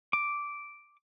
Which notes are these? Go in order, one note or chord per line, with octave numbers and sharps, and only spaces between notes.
D6